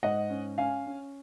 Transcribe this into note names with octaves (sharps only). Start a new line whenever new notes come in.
G#2 D#5 F#5
C#4
C#4 F5 G#5
C#4